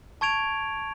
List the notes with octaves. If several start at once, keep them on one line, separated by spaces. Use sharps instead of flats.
A5 C#6 G#6 D7 F7